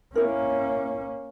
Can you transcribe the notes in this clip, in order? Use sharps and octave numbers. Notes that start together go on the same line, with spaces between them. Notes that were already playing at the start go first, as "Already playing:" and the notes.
A#3 C#4 E4 A#4